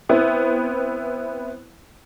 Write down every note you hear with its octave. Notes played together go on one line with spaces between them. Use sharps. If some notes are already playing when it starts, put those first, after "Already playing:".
B3 C4 E4